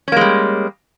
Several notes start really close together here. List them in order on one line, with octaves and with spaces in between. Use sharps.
C#4 A#3 G#3 G3